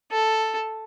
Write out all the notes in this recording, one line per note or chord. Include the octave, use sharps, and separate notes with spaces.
A4